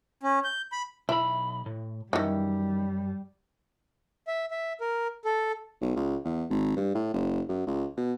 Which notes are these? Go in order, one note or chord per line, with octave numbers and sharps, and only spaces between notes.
C#4
G6
B5
B1 E4 B5
A2
F#2 D#3 E3 G3
E5
E5
A#4
A4
B1
C#2
E2
G#1
G2
A2
F#1
F#2
C#2
B2